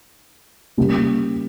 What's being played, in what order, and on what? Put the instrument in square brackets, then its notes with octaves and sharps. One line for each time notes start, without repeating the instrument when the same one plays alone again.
[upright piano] C#3 G3 A#3